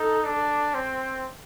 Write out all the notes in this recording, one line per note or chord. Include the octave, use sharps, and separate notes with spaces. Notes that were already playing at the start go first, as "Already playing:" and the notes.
Already playing: D#4 A4
D4
C4